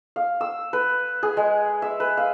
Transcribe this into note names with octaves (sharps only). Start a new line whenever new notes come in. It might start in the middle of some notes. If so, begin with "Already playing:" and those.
F5
E6
B4
G#4
G#3
E5
B4
F5